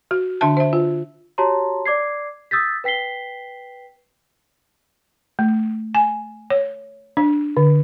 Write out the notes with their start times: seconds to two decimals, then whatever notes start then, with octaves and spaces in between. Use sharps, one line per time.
0.11 F#4
0.41 D3 D4 E5 A5
0.57 C5 E5
0.73 F4
1.38 F#4 G4 C#5 A5 A#5 C6
1.86 D5 D6 G#6 C7
2.51 D#6 E6 G6 A6 B6
2.84 B4 G5 B6 C7 G7
5.39 A3
5.95 G#5
6.50 C#5
7.17 D4
7.57 D3